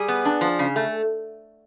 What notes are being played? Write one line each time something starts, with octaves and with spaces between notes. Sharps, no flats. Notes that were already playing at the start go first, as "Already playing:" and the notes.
Already playing: G3 G#4
B3
D4
F3
C#3
A3